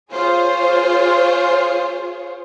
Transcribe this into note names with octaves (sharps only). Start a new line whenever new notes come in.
F4 G#4 C5 C#5